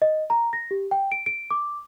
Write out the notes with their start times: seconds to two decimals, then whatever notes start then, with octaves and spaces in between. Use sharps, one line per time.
0.02 D#5
0.30 A#5
0.53 A#6
0.71 G4
0.91 G5
1.12 D7
1.26 D7
1.51 D6